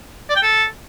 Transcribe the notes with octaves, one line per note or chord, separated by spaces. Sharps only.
D5
G5
A4